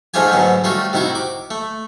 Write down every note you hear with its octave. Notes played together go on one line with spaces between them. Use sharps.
G#2 F3 A3 F4 G4 G#5
G#2 D3 F#3 B3
G3 A3 F4 F#4
C3 D#3 E4 F#4
D6
A3